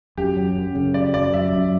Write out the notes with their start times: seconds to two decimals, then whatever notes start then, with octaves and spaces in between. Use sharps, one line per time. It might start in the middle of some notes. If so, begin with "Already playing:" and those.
0.18 F#2 G4
0.37 F#3
0.56 F#2
0.75 C#3
0.94 F#3 D5
1.14 F#2 D5
1.33 F#3 E5
1.53 F#2